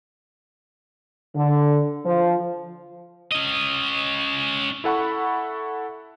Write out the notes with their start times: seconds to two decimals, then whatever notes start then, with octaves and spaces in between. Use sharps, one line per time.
1.36 D3
2.05 F3
3.31 C#4 D#5
4.84 E4 A4 F#5 B5 C#6